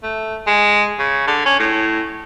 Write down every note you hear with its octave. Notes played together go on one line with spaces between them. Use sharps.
A3
G#3
C#3
D3
C#4
A2